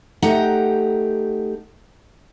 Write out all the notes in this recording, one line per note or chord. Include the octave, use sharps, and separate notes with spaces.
A3 D#4 G4 F#5 A#5